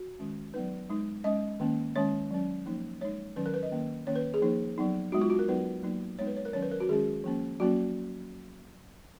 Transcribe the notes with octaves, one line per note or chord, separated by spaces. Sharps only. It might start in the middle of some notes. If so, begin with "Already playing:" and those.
Already playing: F#4
D#3 G#3 C#4
F#3 B3 D#4 B4
G#3 D#4
G#3 C#4 D#5
D#3 A#3 C#4
D#3 G#3 C#4 C#5
F#3 C#4
F3 A#3 D#4
G#3 D#4 C#5
D#3 F#3 C#4 B4
A#4
B4
D#5
D#3 A#3 C#4
D#3 A#3 C#4 C#5
B4
G#4
F3 A#3 D#4
F#3 B3 D#4
G#3 B3 D#4 F#4
F4
F#4
A#4
F#3 B3 D#4 B4
F#3 A#3 D#4
G#3 B3 D#4 C#5
B4
C#5
A#4
D#3 F#3 C#4 C#5
B4
A#4
F#4
D#3 G#3 C#4 G#4
F3 A#3 C#4
F#3 A#3 C#4 F#4